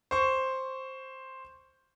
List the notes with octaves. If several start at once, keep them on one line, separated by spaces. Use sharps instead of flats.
C5 C#6